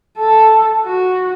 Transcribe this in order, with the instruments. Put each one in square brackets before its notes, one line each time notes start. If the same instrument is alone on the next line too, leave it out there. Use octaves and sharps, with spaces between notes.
[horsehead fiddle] A4
F#4